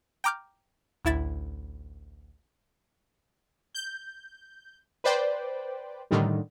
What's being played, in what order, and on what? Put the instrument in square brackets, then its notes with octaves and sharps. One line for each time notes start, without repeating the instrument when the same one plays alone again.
[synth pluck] G5 A#5 D6 F6 G6
A1 D2 E4 E5 A6 E7
[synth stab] G6
B4 C5 D5 G5
A2 D3 D#3 G3